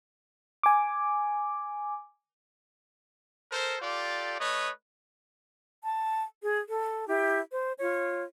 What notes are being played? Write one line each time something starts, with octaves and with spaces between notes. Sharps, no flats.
G#5 D6
A4 A#4 C5
F4 G4 A4 D5
A3 B4 C#5 D#5
A5
G#4
A4
E4 G4
C5
F4 C#5